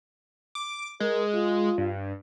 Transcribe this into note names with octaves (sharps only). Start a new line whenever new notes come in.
D6
G#3 A#4
F4
G2